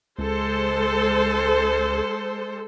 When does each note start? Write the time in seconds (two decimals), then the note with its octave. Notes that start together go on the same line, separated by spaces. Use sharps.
0.19 C#2 G#3 A4 C5